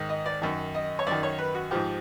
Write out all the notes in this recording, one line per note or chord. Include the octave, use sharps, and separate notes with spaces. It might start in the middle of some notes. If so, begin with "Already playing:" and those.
Already playing: G#2 D#3
D#5
D5
F#2 D#3
D#5
C#5
F#2 D#3 D5
C#5
B4
F#4
G#2 F3 G4